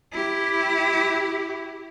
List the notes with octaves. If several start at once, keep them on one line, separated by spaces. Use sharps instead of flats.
E4 G4